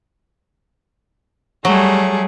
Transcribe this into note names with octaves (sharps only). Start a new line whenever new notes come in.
F#3 G3 A3 G#4